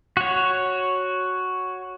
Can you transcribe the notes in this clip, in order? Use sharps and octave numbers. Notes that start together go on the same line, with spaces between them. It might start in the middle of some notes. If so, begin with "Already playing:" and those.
F#4 C#5